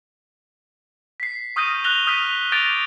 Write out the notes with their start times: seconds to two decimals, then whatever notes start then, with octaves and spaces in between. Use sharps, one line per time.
1.20 B6 C7
1.56 C#6 D#6 F6 G6 A#6 D#7
1.84 F6 F#6 A#6 F7 G7
2.07 D#6 F6 G6 A#6 B6 D#7
2.52 D6 G6 A6 A#6 D7 F7